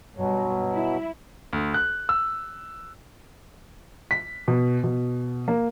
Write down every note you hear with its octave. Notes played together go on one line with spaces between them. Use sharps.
G2 B2 F#3
E4
D2
F#6
E6
B6
B2
B2
A#3